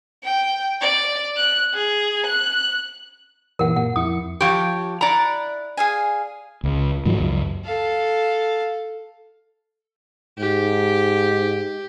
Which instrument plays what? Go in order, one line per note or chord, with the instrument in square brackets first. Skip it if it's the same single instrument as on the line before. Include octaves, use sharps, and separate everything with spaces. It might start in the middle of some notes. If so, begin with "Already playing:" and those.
[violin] G5
D5
F#6
G#4
F#6
[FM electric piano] F#2 A#2 E3 [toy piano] A#4 F#5
[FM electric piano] A#2 [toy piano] F#5
[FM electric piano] F2 E4 C#7 [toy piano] D#6
[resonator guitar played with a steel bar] F3 G4 [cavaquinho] C#5
[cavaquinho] E4 F#5 [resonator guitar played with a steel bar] D5 A#5
[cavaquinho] G#4 F5 G#5
[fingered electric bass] C#2
G#2 D#3 F3 F#3
C#2 F#2
[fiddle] A4 F5
[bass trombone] G#2 [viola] G4